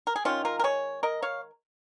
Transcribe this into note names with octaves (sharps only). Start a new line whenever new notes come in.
A#4
G#4
D#3 G#3 C#4 F4
F4 A#4
A#4
G#4 C#5
A#4 D#5
C#5 F5